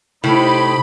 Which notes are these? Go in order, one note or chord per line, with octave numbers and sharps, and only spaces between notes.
A2 C3 D#4 G4 C5 B5